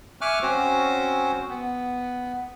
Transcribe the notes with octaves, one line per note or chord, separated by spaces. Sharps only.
E5 G#5 C#6 D6 F6 F#6
C4 C#4 F#4 C5
B3